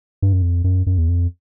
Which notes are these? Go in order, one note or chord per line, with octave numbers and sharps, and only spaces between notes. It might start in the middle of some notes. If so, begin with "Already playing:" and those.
G2
F#2
F2
F#2
F#2
E2
F2